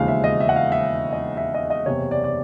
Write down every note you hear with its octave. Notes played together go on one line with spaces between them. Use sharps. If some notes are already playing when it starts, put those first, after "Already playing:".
Already playing: E1 D#2 C#3 F3 G#3 F5
E5
D#5
E5
F#5
F5
E5
D#5
E5
D#5
D#5
F#1 E2 C3 C#5
D5
D5